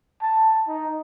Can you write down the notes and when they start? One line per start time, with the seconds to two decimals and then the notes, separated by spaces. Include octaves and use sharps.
0.22 A5
0.67 D#4